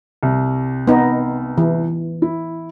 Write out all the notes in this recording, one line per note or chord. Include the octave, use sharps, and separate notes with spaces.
C2
B3 D#4
E3
E4